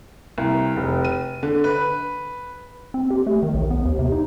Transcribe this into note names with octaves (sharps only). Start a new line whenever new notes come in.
C2
F1
D#7
D3
B4
C4
G4
A3
D#3
B1
B3
D#2
C3
D#4